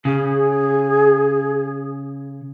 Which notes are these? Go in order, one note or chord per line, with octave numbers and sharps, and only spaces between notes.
C#3 G#4